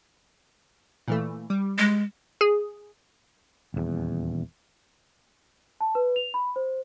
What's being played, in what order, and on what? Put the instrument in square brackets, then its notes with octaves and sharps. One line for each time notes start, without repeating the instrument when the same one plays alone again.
[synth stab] A#2 E3 A3
G3
[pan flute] G#3
[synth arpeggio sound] G#4
[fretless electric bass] D#1 E2
[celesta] A5
B4
F7
B5
C5